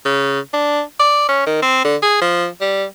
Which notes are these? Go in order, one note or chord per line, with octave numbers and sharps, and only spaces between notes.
C#3
D4
D5
C#4
D#3
C4
D3
G#4
F3
G3